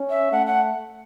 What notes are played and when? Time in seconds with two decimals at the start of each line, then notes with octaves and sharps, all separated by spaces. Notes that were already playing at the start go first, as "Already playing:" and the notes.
Already playing: C#4
0.10 E5
0.32 A3 F#5
0.47 F#5